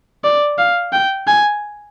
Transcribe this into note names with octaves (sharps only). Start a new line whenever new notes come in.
D5
F5
G5
G#5